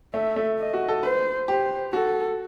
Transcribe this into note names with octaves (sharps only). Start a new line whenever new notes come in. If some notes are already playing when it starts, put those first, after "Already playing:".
A3 E5
A3
D#5
F#4
A4
B4 C5
G4 C5
F#4 A4